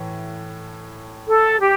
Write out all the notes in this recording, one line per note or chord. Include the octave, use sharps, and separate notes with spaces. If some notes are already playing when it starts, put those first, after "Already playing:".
Already playing: A2 E3 A3
A4
G4